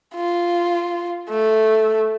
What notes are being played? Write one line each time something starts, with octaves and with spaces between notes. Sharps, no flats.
F4
A3